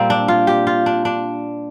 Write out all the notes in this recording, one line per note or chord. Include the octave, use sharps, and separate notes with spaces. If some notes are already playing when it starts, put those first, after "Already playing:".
Already playing: A#2 G3 A#3 C4
D4
F4
G4
F4
D4
D4